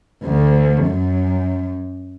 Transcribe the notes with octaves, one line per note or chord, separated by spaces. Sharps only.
D2
F#2